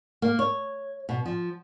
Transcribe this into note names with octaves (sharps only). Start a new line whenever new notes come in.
A#3
C#5
B2
F3